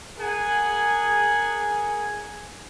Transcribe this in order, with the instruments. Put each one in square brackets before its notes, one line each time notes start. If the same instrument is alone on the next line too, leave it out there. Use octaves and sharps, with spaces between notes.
[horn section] G#4 A#4 F#5 G#5